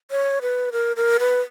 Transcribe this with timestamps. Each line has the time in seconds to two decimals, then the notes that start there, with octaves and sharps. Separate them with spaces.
0.11 C#5
0.42 B4
0.72 A#4
0.96 A#4
1.19 B4